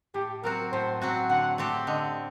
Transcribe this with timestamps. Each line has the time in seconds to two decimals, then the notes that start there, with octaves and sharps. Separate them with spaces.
0.14 A2 G4
0.44 F#3 C4 F#4 A#4
0.72 A2 C5
1.02 F#3 C4 F#4
1.29 D3 F#5
1.58 A3 C4 G4
1.87 D3 D#5